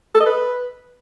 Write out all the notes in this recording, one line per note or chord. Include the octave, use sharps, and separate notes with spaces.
A4
D#5
B4